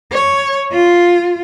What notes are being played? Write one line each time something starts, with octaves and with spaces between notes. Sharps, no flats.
C#5
F4